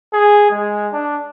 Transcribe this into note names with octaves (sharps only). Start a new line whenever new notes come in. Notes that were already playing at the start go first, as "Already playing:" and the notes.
G#4
G#3
D4